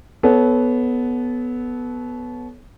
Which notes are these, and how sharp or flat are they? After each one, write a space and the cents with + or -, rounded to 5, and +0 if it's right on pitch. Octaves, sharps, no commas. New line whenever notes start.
B3 +0 A4 -25 C#5 +5